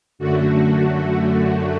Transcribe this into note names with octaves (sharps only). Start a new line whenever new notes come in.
F#2 D3 A3 F#4